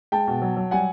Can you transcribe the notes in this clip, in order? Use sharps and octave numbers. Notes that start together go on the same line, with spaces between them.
G#3 G5 A5
B2
F#3
F#3
G3 F#5 G#5